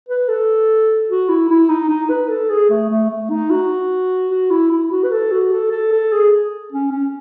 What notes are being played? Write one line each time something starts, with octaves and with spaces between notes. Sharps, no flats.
B4
A4
F#4
E4
E4
D#4
D#4
B4
A4
G#4
A3
A3
A3
D#4
F#4
F#4
E4
E4
F#4
B4
A4
F#4
A4
A4
A4
G#4
C#4
C#4